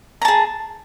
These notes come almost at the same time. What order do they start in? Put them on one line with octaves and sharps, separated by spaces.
A#5 A5 G#4